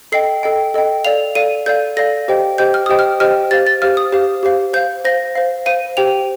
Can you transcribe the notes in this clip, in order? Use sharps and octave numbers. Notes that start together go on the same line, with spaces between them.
A4 D#5 G5 C7
A4 D#5 G5
A4 D#5 G5
A4 D5 F5 F7
A4 D5 F5 D#7
A4 D5 F5 G6
A4 D5 F5 A#6
G4 C5 D#5 G5
G4 C5 D#5 G5 G6
F6
G4 C5 D#5 G5 D#6
F6
G4 C5 D#5 G5 F6
G4 C5 F5 A6
A6
G4 C5 F5 F6
D#6
G4 C5 F5
G4 C5 F5
C5 F5 G6
C5 F5 A#6
C5 F5
C5 F5 D#7
G4 C5 G5 F7